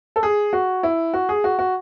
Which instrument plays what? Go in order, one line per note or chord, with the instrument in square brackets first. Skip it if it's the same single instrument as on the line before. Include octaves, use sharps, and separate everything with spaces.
[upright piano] A4
G#4
F#4
E4
F#4
G#4
F#4
F#4